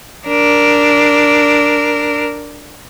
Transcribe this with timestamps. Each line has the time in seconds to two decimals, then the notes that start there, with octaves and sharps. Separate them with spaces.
0.27 D4 A#4